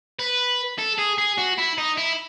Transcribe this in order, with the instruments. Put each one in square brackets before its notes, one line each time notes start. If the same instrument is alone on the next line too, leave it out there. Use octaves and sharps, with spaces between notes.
[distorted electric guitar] B4
A4
G#4
G#4
F#4
E4
D#4
E4